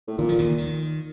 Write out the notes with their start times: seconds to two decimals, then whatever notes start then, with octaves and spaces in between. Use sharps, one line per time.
0.07 A2
0.18 A#2 D#3
0.29 F3
0.38 D#2 D#3
0.58 D#3